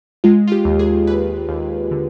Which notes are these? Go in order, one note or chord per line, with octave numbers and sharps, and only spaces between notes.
G#3 F4
F4
G4
D#2
G#4
D#2 B4
D#2
D3